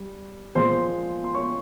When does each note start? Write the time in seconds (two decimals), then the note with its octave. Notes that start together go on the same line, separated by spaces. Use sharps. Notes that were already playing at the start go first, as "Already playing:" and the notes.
Already playing: G3
0.55 A#2 F3 G#3 C5 C6
1.24 C6
1.34 C#5 C#6